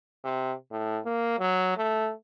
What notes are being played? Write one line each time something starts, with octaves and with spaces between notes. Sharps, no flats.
C3
A2
A#3
F#3
A3